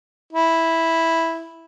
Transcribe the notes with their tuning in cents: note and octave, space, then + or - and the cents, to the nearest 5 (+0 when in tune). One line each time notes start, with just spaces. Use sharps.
E4 -5